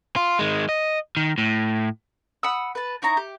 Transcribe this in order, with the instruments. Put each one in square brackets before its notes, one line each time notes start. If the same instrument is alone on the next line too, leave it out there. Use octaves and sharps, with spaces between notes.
[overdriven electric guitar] F4
D#3 G#3
D#5
D#3
A2
[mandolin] F#5 B5 D#6 E6
B4 A5
D#4 E4 C#5 A#5
G4